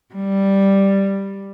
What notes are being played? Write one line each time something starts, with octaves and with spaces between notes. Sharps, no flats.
G3